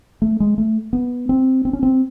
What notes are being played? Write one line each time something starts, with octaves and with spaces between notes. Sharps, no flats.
A3
G#3
A3
B3
C4
C4
C#4
C4